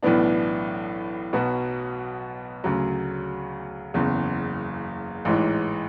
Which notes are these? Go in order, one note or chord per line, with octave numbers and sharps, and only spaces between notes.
B1 A2 E3 B3 D4
B1 B2 F#3 B3 F#4
D2 C#3 F#3
F#1 E2 C#3
A1 G#2 E3